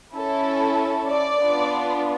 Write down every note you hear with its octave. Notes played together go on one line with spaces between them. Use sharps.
C#4 E4 A4
D5
B3 D4 F4